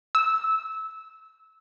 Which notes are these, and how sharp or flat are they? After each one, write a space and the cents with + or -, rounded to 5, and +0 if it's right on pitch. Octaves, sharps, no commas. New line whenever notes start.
E6 -20